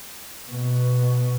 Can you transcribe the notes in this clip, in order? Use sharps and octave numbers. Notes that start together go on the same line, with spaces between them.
B2